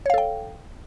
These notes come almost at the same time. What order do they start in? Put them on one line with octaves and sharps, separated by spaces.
C#5 F5 A4 G5